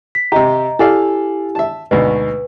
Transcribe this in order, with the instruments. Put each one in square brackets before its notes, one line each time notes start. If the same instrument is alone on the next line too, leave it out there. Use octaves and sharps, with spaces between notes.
[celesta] B6
[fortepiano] C3 G4 [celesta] D#5 A#5
[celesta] E4 G4 G#5 [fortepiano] A4 D5 F5
[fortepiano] E5 A5
[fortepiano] D2 G#2 B2 [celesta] B4